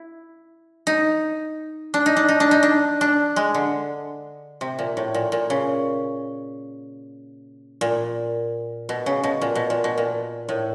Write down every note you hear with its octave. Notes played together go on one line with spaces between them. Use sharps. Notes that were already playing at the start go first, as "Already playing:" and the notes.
Already playing: E4
D#4
D4
D#4
D4
D#4
D4
D#4
D4
D4
G#3
D3
C3
A#2
A2
A#2
A#2
C#3
A#2
B2
C#3
B2
A#2
B2
A#2
B2
A#2
A2